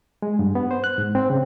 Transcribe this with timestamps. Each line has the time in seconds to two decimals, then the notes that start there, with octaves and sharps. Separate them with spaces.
0.22 G#3
0.39 G2
0.55 B3
0.71 C5
0.84 F#6
0.98 G#2
1.15 C4
1.30 C#3